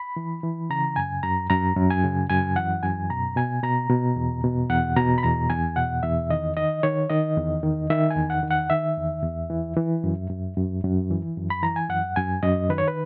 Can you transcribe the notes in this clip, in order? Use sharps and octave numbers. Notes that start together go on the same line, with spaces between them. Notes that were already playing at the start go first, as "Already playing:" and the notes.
Already playing: B5
E3
E3
C#3 A#5
F#2 G#5
F#2 A#5
F#2 A#5
F#2
G#5
C#3
F#2 G#5
E3 F#5
F#2 G#5
B2 A#5
B2 G#5
B2 A#5
B2
E2
B2
E2 F#5
B2 A#5
B5
E2 A#5
E2 G#5
B2 F#5
E2 E5
D#3 D#5
D#3 D#5
D#3 C#5
D#3 D#5
E2
D#3
D#3 E5
G#5
E2
F#5
D#3
F#5
D#3 E5
E2
E2
E3
E3
F#2
F#2
F#2
F#2
E3
F#2
B5
E3 A#5
G#5
F#2 F#5
F#2 G#5
F#2 D#5
D#3 B4
C#5
B4